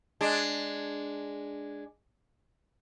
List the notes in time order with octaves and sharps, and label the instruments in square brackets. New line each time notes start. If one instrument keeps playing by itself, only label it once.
[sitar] G#3 D4